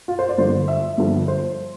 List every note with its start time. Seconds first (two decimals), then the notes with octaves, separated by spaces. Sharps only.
0.08 F4
0.19 C5
0.29 D5
0.38 G2 D3 F3 C5
0.68 E5
0.98 G2 D3 F3
1.28 C5